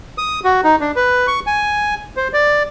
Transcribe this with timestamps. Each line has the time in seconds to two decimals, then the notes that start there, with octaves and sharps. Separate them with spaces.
0.18 D#6
0.44 F#4
0.64 D#4
0.81 D4
0.96 B4
1.27 C#6
1.47 G#5
2.17 C5
2.33 D5